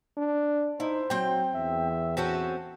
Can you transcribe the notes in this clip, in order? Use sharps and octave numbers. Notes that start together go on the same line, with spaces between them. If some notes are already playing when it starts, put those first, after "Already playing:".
D4
D#4 E4 C5
F#3 C4 G5
E2 E5
C4 C#4 F#4 A4